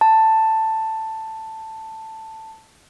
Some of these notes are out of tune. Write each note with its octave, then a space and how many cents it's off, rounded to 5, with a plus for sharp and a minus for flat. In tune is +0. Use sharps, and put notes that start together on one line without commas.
A5 +5